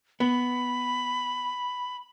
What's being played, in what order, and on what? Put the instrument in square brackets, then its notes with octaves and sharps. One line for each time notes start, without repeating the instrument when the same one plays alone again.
[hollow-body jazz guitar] B3 [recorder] B5